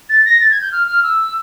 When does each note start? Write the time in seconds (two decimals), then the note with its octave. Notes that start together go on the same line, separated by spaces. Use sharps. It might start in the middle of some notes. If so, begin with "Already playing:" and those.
0.09 A6
0.25 A#6
0.40 A6
0.51 G#6
0.61 G6
0.72 F6
0.87 F6
1.03 E6